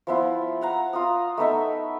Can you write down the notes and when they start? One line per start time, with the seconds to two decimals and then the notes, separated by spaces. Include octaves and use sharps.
0.07 F3 B3 E4 F4
0.61 F5 F#5 A#5
0.93 F4 A#5 D#6
1.37 A3 B3 D#4 E5